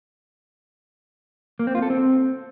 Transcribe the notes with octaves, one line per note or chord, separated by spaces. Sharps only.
A#3
C4
F4
A4
C4